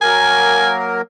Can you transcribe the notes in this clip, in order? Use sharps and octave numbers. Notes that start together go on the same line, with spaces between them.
F#3 A#3 A#4 G#5